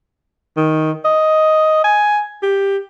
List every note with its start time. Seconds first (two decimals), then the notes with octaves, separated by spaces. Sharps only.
0.57 D#3
1.05 D#5
1.84 G#5
2.43 G4